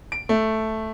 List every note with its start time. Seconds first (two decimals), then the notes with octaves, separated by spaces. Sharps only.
0.12 D7
0.29 A3